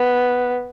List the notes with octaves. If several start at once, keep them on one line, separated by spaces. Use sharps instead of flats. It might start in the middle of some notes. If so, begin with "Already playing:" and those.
Already playing: B3